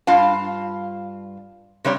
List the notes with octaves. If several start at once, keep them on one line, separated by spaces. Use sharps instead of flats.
G2 F4 F5 A5
C3 G3 C#5 D5